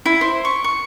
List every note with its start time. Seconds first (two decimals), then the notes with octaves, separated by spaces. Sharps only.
0.06 E4
0.21 C5
0.45 C#6
0.64 C#6